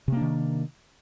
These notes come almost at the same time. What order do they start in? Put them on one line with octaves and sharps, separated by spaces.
C3 A#3 D4 D#3